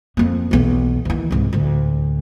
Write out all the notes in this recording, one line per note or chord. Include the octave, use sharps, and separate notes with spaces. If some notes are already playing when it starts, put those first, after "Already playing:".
F2 A#3
B1 E2
D#2 E3
C2 G#2
D2 A2